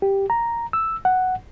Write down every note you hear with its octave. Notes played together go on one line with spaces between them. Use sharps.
G4
A#5
E6
F#5